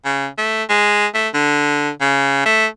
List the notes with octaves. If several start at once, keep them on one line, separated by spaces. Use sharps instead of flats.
C#3
A3
G#3
A3
D3
C#3
A3